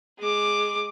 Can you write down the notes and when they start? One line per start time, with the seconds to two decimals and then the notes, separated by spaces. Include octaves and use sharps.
0.19 G#3 D6